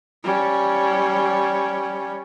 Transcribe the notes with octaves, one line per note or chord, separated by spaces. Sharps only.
G3 C#4